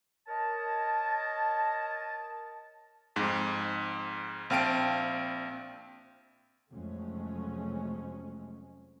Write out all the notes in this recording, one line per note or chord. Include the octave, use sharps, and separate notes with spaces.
A#4 C#5 D#5 A5
F2 G#2
A#1 C4 F5 G5 A5 D7
F1 F2 F#3 G#3 A3 C#4